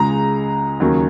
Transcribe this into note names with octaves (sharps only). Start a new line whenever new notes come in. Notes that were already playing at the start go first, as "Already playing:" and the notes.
Already playing: C#2 C#3 G#3 A#5
D#2 C#3 F#3 A#3